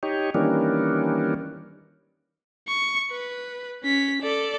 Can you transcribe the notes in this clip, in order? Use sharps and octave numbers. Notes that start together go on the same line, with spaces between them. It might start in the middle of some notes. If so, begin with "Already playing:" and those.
D#4 G4 C#5
D#3 E3 G3 A#3 C#4 D4
C#6
B4
C#4 B6
A4 D5